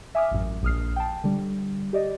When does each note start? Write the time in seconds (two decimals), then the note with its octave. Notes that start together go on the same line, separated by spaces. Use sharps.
0.15 E5 G#5 D6 D#6 F6
0.31 A1 F#2
0.63 A#1 D#6 F6 C7
0.96 G5 A5
1.24 D3 G3
1.93 G4 D5 D#5